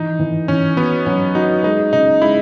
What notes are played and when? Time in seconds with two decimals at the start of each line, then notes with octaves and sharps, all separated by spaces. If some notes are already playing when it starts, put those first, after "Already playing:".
Already playing: E3 D#4
0.19 E3
0.48 E3 C#4
0.77 B3 F#4
1.06 F#3 C#4
1.35 D#4 F#4
1.63 G#3 D#4
1.93 C#3 D#4
2.22 G#3 E4